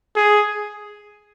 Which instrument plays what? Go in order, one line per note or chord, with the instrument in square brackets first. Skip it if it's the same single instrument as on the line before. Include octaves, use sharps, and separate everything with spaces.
[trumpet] G#4